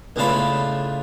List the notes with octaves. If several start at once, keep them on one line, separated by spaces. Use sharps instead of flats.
C#2 A2 C#3 D4 F4 B5